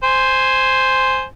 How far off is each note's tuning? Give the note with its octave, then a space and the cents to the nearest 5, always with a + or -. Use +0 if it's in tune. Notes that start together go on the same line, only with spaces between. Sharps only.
C5 +0 G#5 +0